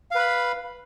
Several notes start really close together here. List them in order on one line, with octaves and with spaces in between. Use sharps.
F5 B4 B5